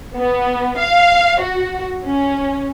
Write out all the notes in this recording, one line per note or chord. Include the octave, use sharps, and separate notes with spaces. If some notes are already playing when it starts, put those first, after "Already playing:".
B3
F5
F#4
C#4